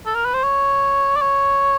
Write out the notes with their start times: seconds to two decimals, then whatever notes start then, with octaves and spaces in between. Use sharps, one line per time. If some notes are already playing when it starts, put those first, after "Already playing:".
0.06 A4
0.15 A#4
0.25 B4
0.34 C5
0.43 C#5
1.16 D5
1.21 C#5